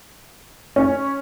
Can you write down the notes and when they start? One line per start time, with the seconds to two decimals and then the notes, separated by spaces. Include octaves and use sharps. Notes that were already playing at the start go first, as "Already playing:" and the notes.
0.76 C#4